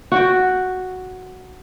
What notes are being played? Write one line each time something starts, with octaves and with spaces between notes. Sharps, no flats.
F#4 G5